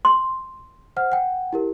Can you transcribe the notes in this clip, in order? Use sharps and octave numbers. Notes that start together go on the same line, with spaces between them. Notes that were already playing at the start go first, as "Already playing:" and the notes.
C6
C5 F#5 F6
F#5 G5
E4 G4 A#4